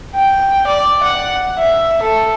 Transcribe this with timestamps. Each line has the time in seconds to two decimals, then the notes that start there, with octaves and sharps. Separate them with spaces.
0.15 G5
0.68 D5
1.03 F#5
1.59 E5
2.02 A4